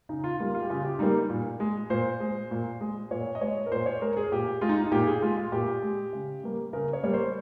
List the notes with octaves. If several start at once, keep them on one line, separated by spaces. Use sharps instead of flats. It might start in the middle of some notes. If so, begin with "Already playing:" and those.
C#3 D#4
F4
G3 A#3 F4
F4
G4
C#3 F4
G4
G3 A#3 D#4
A#2
G#3
A#2 C5
G#3
A#2
G#3
A#2 C#5
D#5
G#3 C#5
A#4
A#2 C5
C#5
G#3 A#4
G#4
A#2 G4
G#3 F4
D#4
D#4
A#2 G4
G#4
G#3 F4
F4
A#2 G4
G#3
C#3
G3 A#3
C#3 A#4
C#5
G3 A#3 C#5
C5